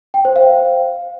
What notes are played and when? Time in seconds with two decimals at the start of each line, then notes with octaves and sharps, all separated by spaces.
0.14 G5
0.25 C5
0.36 F5